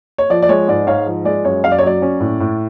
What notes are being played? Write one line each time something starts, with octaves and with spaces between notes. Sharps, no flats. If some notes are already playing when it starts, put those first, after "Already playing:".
C#5
F3 D5
D5
G#3 C#5
G#2 D5
G#2 C#5 F5
F3
G#3 D5
F#2 C#5
F#2 F5
D5
C#5
F#3 D5
C#4
A2
A2